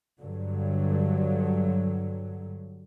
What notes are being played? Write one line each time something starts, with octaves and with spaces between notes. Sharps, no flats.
G2 D3 F#3